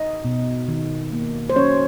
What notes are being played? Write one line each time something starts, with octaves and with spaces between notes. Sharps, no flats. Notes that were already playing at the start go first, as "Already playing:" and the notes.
Already playing: D#4 D#5
B2
D#3
A#3
C5
F#3 C#4 C#5